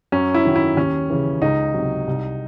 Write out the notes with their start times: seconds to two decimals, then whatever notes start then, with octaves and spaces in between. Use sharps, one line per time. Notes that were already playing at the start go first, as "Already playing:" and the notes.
0.12 F#2 C#4
0.34 E4
0.45 D#3 F#3
0.56 E4
0.77 D#2 C#4
1.10 C#3 E3
1.42 C#2 D#4
1.74 C3 F#3
2.07 C2